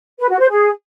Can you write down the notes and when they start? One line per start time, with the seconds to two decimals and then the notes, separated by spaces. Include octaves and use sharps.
0.19 B4
0.29 F#4
0.39 C5
0.50 G#4